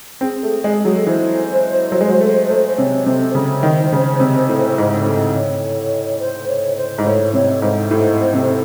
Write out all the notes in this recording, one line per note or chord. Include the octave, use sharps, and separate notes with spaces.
C4 G#4
A3
G#3 G#4
F#3 G#4
A4
E3 C5
F#3
G#3
F#3
A3
A3
C3 C#5
C3 C5
C#3 C5
D#3
D#3
C#3
C3
A2
G#2
A2
C#5
C5
C#5
C5
G#2
A2 C#5
C3 C#5
G#2 C5
A2
C3